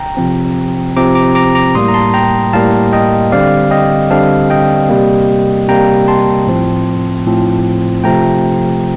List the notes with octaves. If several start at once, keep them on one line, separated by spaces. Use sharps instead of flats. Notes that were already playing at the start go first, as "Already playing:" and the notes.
Already playing: G5 A#5
C3 F3 C4
C3 F3 C4 A#5 D6
A#5 D6
A#5 D6
A#5 D6
A2 G3 A#3 C6 D#6
A#5
A5 C6
G5 A#5
A2 G3 A#3 F5 A5
D#5 G5
D3 G3 C4 D5 F5
D#5 G5
D3 G3 C4 F5 A5
D#5 G5
C3 G3 A#3
C3 G3 A#3 G5 A#5
A5 C6
A2 F3 C4
A2 F3 C4
C3 F3 A3 G5 A#5